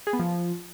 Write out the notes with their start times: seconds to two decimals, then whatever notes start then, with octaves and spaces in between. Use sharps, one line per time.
0.07 G#4
0.13 B3
0.19 F3